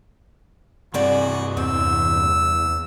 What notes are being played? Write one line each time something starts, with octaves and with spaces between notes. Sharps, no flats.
G2 C3 C4 F#4 G#4 D5
E2 C4 E6